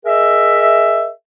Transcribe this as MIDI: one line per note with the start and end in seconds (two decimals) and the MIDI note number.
0.06 1.08 68
0.06 1.08 70
0.06 1.08 75
0.06 1.08 76